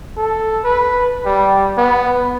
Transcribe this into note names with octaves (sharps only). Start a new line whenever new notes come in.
A4
B4
G3
B3